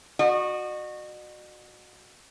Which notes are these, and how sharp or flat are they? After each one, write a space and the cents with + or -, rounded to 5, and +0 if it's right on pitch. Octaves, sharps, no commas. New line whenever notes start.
F#4 -15 D#5 -45